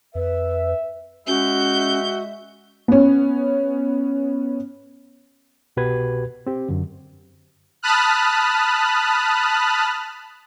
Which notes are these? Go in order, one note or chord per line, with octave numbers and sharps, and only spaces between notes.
F2 B4 E5
G#3 C#4 F#4 E5 G6
B3 C#4
C2 B2 F#4 G4 B4 G#6
C4 G4
F#2 D3
A5 B5 D#6 F6 F#6